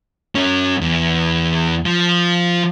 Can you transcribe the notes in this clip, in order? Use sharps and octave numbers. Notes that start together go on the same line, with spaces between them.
F#3 C#4
E2
F3